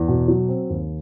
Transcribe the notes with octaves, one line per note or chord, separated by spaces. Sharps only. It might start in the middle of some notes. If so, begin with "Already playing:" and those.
Already playing: E2
B2
F#3
C4
D#2